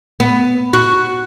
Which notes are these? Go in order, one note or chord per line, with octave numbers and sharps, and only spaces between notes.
B3
F#4